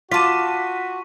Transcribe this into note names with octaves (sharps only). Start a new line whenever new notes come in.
F4 F#4 A5 D6 B6 D#7